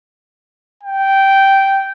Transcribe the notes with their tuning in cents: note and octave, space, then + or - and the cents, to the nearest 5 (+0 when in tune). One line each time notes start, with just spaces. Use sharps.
G5 -10